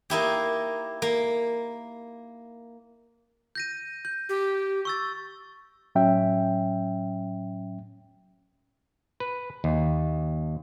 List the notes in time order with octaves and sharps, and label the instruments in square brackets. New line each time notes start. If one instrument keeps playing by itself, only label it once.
[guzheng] A#3 D#4 E4 G4
A#3
[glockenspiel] G6 A#6 D#7
G6
[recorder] G4
[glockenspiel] C#6 E6 A6
[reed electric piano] A2 F#3 C#4 E5 G5
[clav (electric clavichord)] B4
D#2